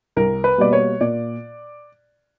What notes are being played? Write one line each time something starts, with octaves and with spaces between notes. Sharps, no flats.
C2 A#4
B4
B2 G3 A#3 D5
C#5
A#2 D5